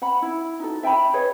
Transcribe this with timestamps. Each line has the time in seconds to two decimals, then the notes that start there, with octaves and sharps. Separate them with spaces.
0.02 F#5 B5
0.22 E4
0.60 D#4 F#4 A4
0.83 E5 G5 A5 B5
1.13 G#4 B4 C#5 D#5